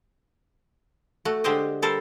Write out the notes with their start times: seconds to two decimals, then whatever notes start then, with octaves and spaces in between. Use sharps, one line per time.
1.25 A3 F#4
1.44 D3 G#3 C4 G4 C5 D#5
1.82 G3 A4 A#4 C5